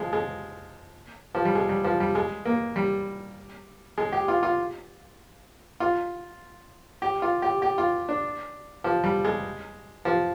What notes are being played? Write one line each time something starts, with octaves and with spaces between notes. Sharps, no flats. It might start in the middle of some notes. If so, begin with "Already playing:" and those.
Already playing: F3 G#3
G#3
F3
G3
G#3
G3
F3
G3
G#3
A#3
G3
G#3
G4
F4
F4
F4
G4
F4
G4
G4
F4
D4
F3
G3
G#3
F3